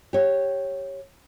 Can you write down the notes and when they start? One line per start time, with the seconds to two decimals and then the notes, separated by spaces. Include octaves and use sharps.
0.13 G4 C#5